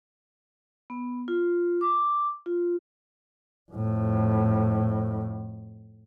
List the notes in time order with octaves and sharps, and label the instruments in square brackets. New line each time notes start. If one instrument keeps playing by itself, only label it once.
[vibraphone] B3
F4
D6
F4
[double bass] F2 A2